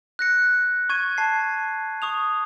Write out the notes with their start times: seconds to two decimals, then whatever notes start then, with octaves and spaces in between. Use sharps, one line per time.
0.19 F#6 A#6 C#7
0.90 C#6 G#6 D#7
1.18 A5 C7
2.02 C#6 D#6 F7